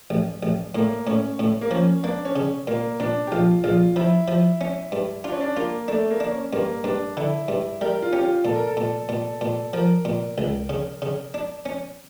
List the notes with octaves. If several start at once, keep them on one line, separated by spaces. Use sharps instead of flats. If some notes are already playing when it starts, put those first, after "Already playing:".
A1
A1
A2 A#3
A2 C#4
A2
A#3
F3 C#4
A#3 D4
C#4
C#3
A#2 A#3
A#2 D4
G4
A#1 F4
A#1 F4
F3 E4
F3
C#4
G2
D4 F4
C#4
D4
A#3 F4
A3 D4
A#3
D4
C#4
G2 A#3
G2 D4
D3 E4
G2
G3 A#4
F4
C#4 G4
F4
A#2 A4
A#4
A4
A#2
A#2
A#2
F3 A#4
A#2
C#2
C#3
C#3
D4
C#4